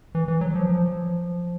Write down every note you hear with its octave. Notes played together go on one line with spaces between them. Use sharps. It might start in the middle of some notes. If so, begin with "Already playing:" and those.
E3
E3
F#3
F3
F3